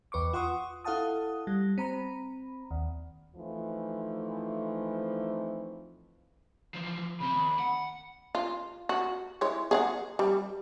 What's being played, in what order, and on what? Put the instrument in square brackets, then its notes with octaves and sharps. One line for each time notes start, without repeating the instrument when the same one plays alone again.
[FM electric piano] E2 B4 C#6 D6
F4 F#5 C6 C#6 D#6
E4 A4 F5 F#5 A5 D#6
G3
C4 A#5 B5
D#2
[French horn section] E3 F3 A3 C4 D#4
[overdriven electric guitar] E3 F3
[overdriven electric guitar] C#3 C4 [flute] B5
[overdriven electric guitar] D#2
F#5
[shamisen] F4
F#4
G#3 E4 C#5
G#4 F5 F#5
G3